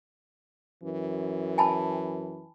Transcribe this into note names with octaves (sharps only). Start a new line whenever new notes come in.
F#2 E3
G#5 A5 B5